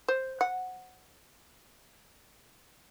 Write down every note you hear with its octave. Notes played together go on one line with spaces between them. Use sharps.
C5
F#5